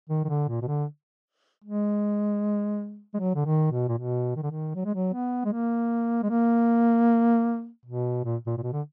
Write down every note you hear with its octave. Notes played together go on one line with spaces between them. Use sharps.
D#3
D#3
D3
A#2
B2
D3
G#3
G#3
F#3
D3
D#3
B2
A#2
B2
D#3
D3
D#3
F#3
G#3
F#3
B3
G#3
A#3
G#3
A#3
B2
A#2
A#2
A#2
B2
D3